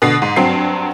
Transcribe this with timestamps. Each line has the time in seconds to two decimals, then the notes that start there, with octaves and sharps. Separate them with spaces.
0.02 B2 D3 C7
0.22 G#2
0.36 G2 F#3 C4 C7